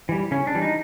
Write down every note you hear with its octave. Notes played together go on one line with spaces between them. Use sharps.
E3 G3
C#3 C#4
D4
E3 G3
D#4